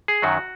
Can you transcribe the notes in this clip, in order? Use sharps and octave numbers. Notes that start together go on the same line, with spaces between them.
G#4
F#2 D#3 F#3 F#4